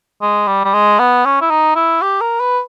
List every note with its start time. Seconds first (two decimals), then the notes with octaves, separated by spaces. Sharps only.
0.22 G#3
0.47 G3
0.65 G3
0.74 G#3
0.99 B3
1.25 C#4
1.41 E4
1.50 D#4
1.76 E4
2.02 G4
2.21 A#4
2.40 B4